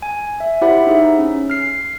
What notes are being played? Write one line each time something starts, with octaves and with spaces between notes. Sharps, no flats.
G#5
E5
E4 G4 C5 E5 F#5 B5
D#4 G#4 E5
C#4
F6 C7